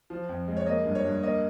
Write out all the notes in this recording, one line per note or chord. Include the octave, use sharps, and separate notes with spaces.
F3
F2
G#3
C#5
A#3 D#5
G2
C#5
G2
A#3 D#5